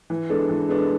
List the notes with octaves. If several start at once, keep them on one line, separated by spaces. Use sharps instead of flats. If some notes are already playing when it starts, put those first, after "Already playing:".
E3
G#3 B3 D4 A4
E3
G#3 B3 D4 A4